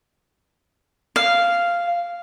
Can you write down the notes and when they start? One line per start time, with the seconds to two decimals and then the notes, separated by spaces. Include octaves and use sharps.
1.16 F5